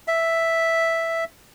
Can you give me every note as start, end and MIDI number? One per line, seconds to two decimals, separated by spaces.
0.08 1.24 76